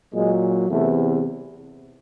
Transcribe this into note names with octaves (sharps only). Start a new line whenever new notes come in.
A#2 F#3 G#3
E2 C3 E3 A3